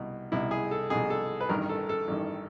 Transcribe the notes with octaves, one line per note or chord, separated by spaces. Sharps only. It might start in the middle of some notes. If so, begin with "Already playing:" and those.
Already playing: C2 B2
C2 B2 E4
G#4
A4
C2 B2 G#4
A4
B4
A1 G2 D#3 A#4
A4
A4
A1 G2 D#3